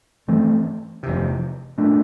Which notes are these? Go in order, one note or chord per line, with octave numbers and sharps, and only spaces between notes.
G2 E3 A3 C4
F1 E2 C3
A#2 A3 D4